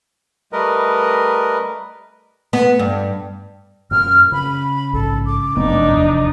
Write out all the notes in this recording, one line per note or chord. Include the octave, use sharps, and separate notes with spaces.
G3 A3 A#4 B4 D#5
B3
G2
F#2 A#2 F6
C#3 B5
A#1 G#2 A4
D6
F1 F#2 A3 B3 D4 D#4
E2